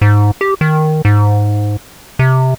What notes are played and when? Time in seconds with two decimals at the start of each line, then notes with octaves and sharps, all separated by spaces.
0.02 G#2
0.41 G4
0.61 D#3
1.05 G#2
2.19 C3